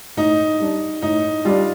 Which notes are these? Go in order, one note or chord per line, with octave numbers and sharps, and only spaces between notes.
A2 D#4
G3 D4
A2 D#4
G3 D4 F4